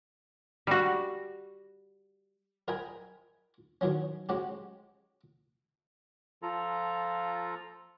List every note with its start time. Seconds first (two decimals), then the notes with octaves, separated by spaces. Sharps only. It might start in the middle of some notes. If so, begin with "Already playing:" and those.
0.67 G3 F#4
2.68 A#4 D#5 E5 G5 G#5 B5
3.81 D#3 E3 F#3 C#4
4.29 G#3 C#4 F#4 G4
6.43 F3 F4 A4 A#5